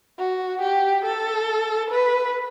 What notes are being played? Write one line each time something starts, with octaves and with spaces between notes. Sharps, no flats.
F#4
G4
A4
B4